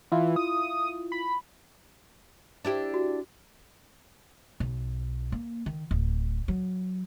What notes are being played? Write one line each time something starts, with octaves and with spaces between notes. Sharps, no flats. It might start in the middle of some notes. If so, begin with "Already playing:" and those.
E3 E4 F4
D#6
B5
D4 E4 G4
F#4
B1
A#3
D#3
D1
F#3